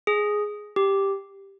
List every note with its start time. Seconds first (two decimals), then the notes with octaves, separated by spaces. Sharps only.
0.07 G#4
0.76 G4